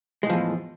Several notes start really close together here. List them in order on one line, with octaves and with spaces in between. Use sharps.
G#3 A2 F3 E2